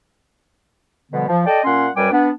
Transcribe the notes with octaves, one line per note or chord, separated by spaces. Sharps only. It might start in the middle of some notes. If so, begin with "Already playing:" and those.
B2 D3 F3 G3 B3
F3
A4 D5 D#5 G5
A#2 C#4 F#5 C6
F#2 G3 B4 G5 G#5 D6
B3 D4